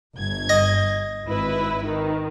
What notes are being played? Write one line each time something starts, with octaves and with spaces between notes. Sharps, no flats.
G1 G#6
D#5
G#1 E4 B4
D#3